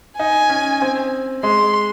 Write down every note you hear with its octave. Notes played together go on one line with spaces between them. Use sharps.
D#4 G#5
C#4
C4
G#3 C6